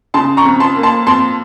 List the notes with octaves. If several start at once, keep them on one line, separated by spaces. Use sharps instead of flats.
C#3 A5 C6
A#5 C#6
F2
A5 C6
A#3
A5 C6
F2 A5 C6